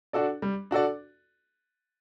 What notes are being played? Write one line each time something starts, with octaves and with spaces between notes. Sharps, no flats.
D4 F#4 A4 D5
G3
D4 F#4 A4 D5